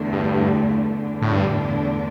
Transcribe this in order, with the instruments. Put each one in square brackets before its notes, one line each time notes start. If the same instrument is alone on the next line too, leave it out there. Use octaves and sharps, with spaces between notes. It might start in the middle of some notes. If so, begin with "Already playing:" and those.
Already playing: [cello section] E2 D3 A3
[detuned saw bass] G2
[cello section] E2 D3 A3 D4
[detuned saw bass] A2
G2